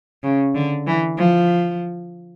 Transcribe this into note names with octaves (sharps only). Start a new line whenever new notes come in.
C#3
D3
E3
F3